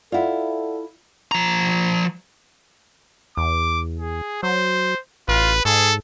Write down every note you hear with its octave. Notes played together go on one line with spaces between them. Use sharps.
E4 F4 A4 D5 F5 F#5
F3 A#5
E2 D6
G#4
F#3 C5
A1 F4 B4
G#2 G#4 A4